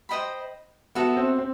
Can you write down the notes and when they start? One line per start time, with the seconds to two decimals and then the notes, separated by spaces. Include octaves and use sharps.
0.09 C5 D#5 G5 B5
0.95 B3 F#4 A4 E5
1.17 C4
1.39 C4